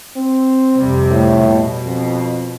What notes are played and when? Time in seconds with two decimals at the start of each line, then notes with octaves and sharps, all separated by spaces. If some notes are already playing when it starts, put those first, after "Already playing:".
0.17 C4
0.74 F2 C3 G3
1.11 A2
1.45 B2
1.85 F2